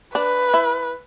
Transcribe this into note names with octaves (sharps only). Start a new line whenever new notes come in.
D4 B4
E4